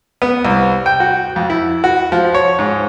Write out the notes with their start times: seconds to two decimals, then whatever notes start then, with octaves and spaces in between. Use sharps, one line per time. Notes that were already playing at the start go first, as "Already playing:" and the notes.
0.22 B3
0.45 C2
0.86 G5
1.00 F#4
1.36 F2
1.50 E4
1.84 F#4
2.12 F3
2.34 C#5
2.59 G#2